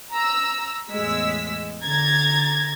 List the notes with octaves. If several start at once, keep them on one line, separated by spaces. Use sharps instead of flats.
A#5 E6
E2 A2 G#3 E6 B6
D3 A#5 G#6 A6